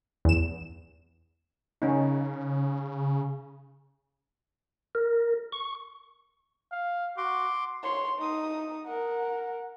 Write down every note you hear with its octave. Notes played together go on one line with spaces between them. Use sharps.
E2 E7
C#3 C#4 D#4
A#4
C#6
F5
F#4 C6 D6
C#5 C6
D#4 D#6
A#4 F#5